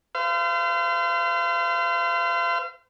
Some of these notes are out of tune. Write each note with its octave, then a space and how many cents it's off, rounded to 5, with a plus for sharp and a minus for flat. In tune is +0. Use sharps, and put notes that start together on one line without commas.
C5 -40 F5 -35